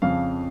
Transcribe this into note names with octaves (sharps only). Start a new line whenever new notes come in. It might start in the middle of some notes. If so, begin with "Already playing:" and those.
F2 C#3 F3 F5